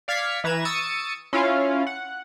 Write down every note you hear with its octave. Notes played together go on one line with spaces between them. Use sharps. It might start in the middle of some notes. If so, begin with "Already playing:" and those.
D5 F5 F6 G#6 B6 C#7
E3 B4 A#5 G#6 E7
C#6 D#6 E6 A6 C#7 D#7
C#4 E4 F4 F5
F#5